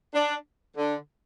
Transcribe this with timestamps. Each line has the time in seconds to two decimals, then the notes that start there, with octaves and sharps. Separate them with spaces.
0.14 D4
0.76 D3